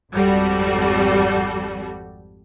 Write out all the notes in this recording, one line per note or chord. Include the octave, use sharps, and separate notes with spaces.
G#1 F2 G3 F#4 A4